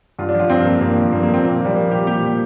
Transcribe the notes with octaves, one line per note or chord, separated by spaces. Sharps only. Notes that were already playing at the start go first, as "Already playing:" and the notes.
G2 F4
D4
F3
F4
G2 C4
F3 A#3
G2 A#3
F3
G2 A#3
A#3
F3
C4
A#2 A#3
F3
G3
A#2 A#3
F3 G4
A#2 G4
F3